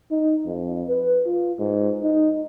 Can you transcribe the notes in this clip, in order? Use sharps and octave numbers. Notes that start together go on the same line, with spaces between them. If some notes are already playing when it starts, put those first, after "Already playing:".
D#4
F2
B4
F4
G#2
D#4